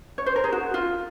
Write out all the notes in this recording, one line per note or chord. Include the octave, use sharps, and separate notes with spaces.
C#5
C5
A#4
G#4
F#4
F4